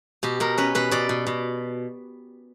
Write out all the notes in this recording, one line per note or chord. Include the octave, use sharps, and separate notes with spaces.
B2 G4
B2 A#4
C#4 B4
B2 B4
B2 D5
B2
B2